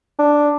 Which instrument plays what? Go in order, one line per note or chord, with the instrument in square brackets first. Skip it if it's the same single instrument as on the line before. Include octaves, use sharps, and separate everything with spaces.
[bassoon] D4